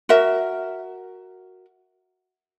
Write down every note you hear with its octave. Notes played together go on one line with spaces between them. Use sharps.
F#4 A#4 E5